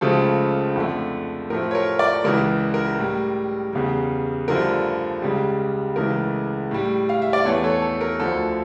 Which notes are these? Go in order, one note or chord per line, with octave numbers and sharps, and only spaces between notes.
C#2 C#3 F3 A3 A4
F2 D3 A3
A2 F3 A3 A#4
C#5
A#4
A#4 D5
C#2 C#3 E3 A#4
A#4
A2 G3
E2 C#3 G3
G2 D3 F3 A3 A#4
C#2 C#3 G3
C#2 C#3 E3 A3 A#4
A2 G3
F5
E5
D5
E2 E3 A3 A4 C#5
A4 C#5
A4
A#4
D2 D3 F3 A4